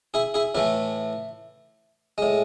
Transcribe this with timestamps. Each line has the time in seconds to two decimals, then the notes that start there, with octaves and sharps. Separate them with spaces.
0.14 E4 G#4
0.34 E4 G#4
0.55 A2 E3 A3 E4
2.18 A2 G#3